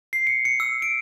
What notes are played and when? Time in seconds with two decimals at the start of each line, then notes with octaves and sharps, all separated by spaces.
0.13 C7
0.27 C#7
0.45 C#7
0.60 E6
0.82 D7